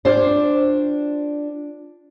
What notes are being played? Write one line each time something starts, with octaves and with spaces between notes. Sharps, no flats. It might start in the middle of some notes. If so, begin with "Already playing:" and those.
D4 F4 G4 C5 D5